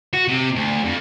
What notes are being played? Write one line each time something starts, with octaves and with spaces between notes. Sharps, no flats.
F#4
C3
D2
F2